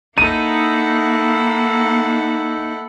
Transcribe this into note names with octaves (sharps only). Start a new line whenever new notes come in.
A#3 D#4 E4 A4 F#5 D#7